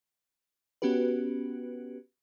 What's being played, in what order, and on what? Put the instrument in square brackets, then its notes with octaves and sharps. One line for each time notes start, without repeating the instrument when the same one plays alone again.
[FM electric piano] B3 C#4 F#4 G4 B4